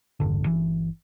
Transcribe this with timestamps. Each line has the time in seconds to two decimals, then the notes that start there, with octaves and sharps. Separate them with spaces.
0.20 E1 A1 G2 D3
0.46 G1 E3